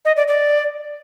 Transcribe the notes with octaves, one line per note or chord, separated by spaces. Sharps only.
D#5
D5
D5